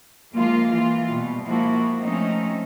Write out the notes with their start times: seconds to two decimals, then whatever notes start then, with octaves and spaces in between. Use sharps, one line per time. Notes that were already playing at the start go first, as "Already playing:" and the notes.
0.34 F3 G#3 A#3 F4
0.72 E3 F4
1.09 B2 G3
1.46 F3 G#3 A#3 E4 F#4
2.02 F3 A3 C4 C#4 D#4